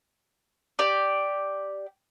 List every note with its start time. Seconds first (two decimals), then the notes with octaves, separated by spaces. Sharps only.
0.79 G4 D5